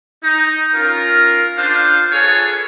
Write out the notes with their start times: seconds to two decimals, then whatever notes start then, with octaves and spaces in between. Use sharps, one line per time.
0.23 D#4
0.74 C#4 F4 A#4
1.57 D4 F4 C5 F5
2.12 F4 G#4 A4 B4 C#5